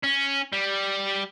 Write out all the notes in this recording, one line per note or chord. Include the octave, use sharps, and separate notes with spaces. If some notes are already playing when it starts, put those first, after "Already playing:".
C#4
G3